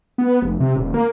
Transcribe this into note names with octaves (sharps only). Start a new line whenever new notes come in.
B3
F1
C3
D#1
A#3